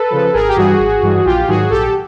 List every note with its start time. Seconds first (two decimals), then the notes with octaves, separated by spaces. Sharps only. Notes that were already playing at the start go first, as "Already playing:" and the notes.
Already playing: A4 B4
0.11 C#3 F3
0.33 G#1 G#4 A#4
0.48 G4
0.56 G2 E3 G3 F#4 G#4
0.79 G#1
1.02 G2 E3 G3
1.25 A#1 F4 G4
1.48 G#2 D#3 F#3 F#4 G#4
1.70 A#1 G4 A4